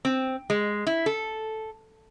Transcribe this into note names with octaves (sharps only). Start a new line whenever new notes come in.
C4
G#3
E4
A4